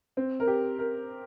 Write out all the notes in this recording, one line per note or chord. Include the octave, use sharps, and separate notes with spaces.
C4
A#4
G4
A#4